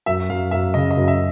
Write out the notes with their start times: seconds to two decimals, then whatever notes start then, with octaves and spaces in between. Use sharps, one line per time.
0.06 F#2 E5
0.29 F#2 F5
0.51 F#2 E5
0.74 C#3 D#5
0.91 D#5
0.97 F#2
1.08 E5